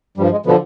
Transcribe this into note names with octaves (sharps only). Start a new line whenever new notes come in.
G2 F3 G3
G#3
B2 D3 F3 B3